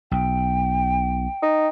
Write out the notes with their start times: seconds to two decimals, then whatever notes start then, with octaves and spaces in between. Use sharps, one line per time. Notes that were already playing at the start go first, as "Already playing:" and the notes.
0.12 B1 G5
1.42 D#4